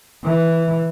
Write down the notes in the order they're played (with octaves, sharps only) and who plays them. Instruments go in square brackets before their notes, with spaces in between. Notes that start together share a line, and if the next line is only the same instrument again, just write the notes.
[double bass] E3